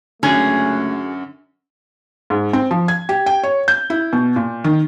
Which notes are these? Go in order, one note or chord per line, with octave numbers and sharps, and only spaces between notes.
C#2 F#2 D3 A3 C#4 F#4 G#4 G#5
G#2
C4
F3
G#6
G4
G5
C#5
G6
E4
B2
A#2
D#3